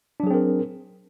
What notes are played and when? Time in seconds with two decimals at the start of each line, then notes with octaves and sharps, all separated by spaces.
0.20 D4
0.23 F#3
0.27 G#4
0.30 C4
0.34 A#4